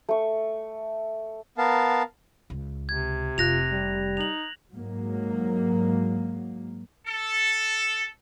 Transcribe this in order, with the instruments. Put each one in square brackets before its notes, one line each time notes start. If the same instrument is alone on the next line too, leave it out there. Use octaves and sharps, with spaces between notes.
[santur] A3 C#6
[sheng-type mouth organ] B3 A#4 F5 A5
[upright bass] C#2
[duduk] C3 [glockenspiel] G#6
[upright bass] F1 [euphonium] F4 [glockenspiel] F#6 A#6 F7
[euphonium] G3
[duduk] D#4 [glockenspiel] F7 F#7
[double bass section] G#2 F#3 A#3
[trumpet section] A4